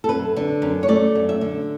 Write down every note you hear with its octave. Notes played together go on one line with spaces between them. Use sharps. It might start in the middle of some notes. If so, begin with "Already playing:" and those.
A4
F#2 B4
D3
F#2
C#5
A3 D5
F#2
E5
D3